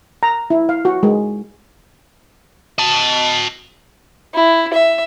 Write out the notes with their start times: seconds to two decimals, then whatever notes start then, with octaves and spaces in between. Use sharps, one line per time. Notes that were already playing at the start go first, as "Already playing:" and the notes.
0.23 A#5
0.50 E4
0.69 F5
0.85 F#4
1.03 G#3
2.78 D#5 A5
4.34 E4
4.73 E5